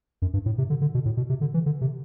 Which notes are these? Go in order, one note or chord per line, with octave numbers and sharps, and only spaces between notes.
F#2
G2
A2
C3
D3
D3
B2
A2
B2
C3
D3
E3
D3
C3